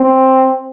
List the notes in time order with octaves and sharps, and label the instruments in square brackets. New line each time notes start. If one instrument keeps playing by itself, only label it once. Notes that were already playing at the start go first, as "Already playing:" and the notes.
Already playing: [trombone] C4